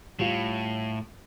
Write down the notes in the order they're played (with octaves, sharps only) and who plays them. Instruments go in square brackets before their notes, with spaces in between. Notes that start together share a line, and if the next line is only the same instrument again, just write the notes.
[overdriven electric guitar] A2 [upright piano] G3 F4